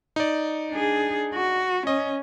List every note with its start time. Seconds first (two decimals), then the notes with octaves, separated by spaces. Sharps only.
0.16 D#4 D5
0.70 D4 G#4
1.34 F#4
1.87 C#4 D#5